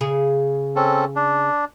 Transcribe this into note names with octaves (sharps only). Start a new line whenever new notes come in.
C#3 G#4
C4 C#4 A4
D4